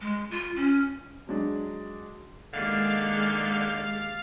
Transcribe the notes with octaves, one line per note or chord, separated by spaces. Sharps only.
G#3
F4
C#4
F#3 G#3 D4
D3 D#3 G#3 A#3 G4 F5 A6